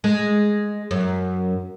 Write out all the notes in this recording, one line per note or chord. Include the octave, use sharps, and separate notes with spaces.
G#3
F#2